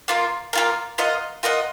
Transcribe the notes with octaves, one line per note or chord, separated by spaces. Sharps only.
A#3 F4 A#4
A#3 F4 A#4
F4 A#4 D#5 F#5
F4 A#4 D#5 F#5